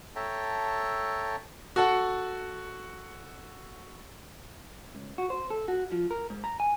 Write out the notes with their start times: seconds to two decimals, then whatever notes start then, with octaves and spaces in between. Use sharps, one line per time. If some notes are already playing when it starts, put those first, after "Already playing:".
0.16 A4 C#5 E5 G5 A5 A#5
1.76 F#4 A4 F#5
4.95 C#2
5.18 F#4
5.30 C5
5.50 A4
5.68 F#4
5.92 F3
6.11 A#4
6.30 G#2
6.44 A#5
6.60 G#5